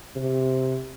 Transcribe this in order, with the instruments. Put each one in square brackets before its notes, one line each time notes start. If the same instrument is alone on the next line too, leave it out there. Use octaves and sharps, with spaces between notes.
[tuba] C3